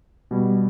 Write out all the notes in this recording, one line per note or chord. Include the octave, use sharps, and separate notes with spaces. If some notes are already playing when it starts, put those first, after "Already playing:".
B2 G3